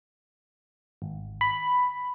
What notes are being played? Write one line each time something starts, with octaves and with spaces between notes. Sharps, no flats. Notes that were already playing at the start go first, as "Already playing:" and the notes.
G#1
B5